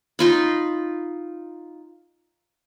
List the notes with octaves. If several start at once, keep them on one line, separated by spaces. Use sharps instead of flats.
D#4 F4 B5